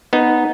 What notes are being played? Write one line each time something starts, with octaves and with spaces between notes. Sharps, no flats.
B3 D#4